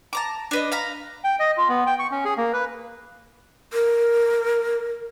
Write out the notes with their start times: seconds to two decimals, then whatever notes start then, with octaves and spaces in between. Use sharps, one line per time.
0.13 A5 A#5 D6
0.51 D4 B4 D#5
0.72 F5 A#5 B5
1.24 G5
1.39 D#5
1.57 F4
1.69 B3
1.87 G5
1.99 C#6
2.11 C#4
2.25 G#4
2.37 A#3
2.53 B4
3.73 A#4